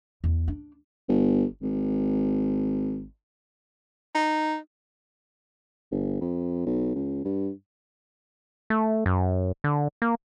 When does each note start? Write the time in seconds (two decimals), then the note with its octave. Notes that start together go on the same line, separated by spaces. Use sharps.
0.24 E2
0.48 D4
1.08 G1
1.61 G#1
4.15 D#4
5.91 G1
6.21 F2
6.66 B1
6.95 C#2
7.25 G2
8.70 A3
9.06 F#2
9.64 D3
10.02 A#3